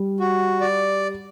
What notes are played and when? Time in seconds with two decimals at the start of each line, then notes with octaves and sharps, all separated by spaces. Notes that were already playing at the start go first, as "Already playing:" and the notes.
Already playing: G3
0.20 F#4
0.61 D5